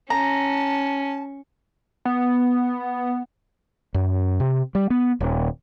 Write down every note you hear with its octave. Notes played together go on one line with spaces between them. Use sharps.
C#4 A5 A#5
B3
F#2
C3
G3
B3
D#1